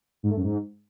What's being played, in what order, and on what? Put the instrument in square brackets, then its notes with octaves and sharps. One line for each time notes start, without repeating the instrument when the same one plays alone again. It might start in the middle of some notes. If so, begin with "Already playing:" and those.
[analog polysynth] G#2
A3
F#2
G#2